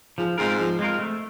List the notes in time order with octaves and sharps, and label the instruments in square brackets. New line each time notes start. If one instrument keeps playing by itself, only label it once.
[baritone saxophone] G#2 [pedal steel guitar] F3
[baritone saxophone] G#2 [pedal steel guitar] G#3 C4 F4 A#4
[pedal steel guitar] F3
G#3 C4 F4 A#4
A3